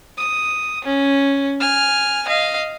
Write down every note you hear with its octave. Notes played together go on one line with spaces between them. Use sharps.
D#6
C#4
G#5 F6
D#5 F5